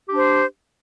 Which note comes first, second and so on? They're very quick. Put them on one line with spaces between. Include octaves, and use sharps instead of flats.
G4 D4 C5